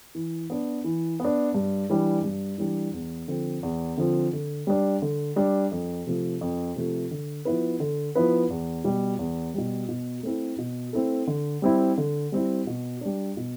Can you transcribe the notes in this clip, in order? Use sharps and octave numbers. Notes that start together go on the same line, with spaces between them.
E3
B3 D4
E3
B3 D4
G2
E3 G3 D4
G2
E3 G3 D4
E2
D3 F3 C4
E2
D3 F3 C4
D3
G3 D4
D3
G3 D4
F2
C3 F3 A3
F2
C3 F3 A3
D3
F3 B3 E4 B4
D3
F3 B3 E4 B4
E2
B2 G3
E2
B2 G3
B2
A3 C4 E4 A4
B2
A3 C4 E4 A4
D3
G3 C4 E4
D3
G3 C4 E4
B2
G3 D4
B2